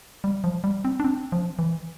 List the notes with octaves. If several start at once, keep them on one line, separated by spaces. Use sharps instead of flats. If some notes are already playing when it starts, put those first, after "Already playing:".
G3
F3
G3
C4
D4
C4
F3
E3